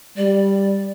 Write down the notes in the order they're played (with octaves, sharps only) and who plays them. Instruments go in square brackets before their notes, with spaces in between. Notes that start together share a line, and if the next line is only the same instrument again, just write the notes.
[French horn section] G3 [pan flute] D5